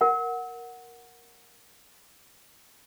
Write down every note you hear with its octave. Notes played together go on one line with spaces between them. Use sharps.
A#4 F#5